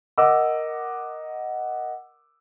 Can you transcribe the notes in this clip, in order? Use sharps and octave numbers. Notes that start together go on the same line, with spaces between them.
A#4 D#5 F#5 D6 E6